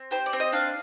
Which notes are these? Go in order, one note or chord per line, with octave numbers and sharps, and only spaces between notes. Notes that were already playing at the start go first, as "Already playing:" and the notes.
Already playing: C4
G4 C5
D5
C4
D#5
D4 F5